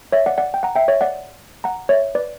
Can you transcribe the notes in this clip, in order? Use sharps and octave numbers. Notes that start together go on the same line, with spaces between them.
C#5 E5
D5 F#5
D5 F#5
G5
F#5 A#5
E5 G5
C#5 E5
D5 F#5
F#5 A#5
C#5 E5
B4 D5